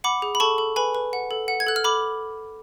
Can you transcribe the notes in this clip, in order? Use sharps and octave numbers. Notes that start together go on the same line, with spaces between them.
F#5 B5 D6
G#4
B5
A4 A5 C#6
A4
B4 G#5 B5
B4
F#5
A4
F#5
G#6
A4 F#6
F6
A4 B5 D6